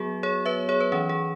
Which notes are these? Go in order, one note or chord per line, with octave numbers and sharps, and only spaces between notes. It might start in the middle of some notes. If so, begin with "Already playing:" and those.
Already playing: F#3 B3 F#4 G#4
G#4 C#5
B4 E5
G#4 C#5
B4
E3 C#4 G#4
G#4